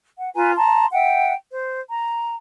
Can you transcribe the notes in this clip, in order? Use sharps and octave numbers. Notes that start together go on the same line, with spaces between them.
F#5
F4 B4 G#5 A#5
A5 A#5 C6
E5 F#5 G5
C5
A#5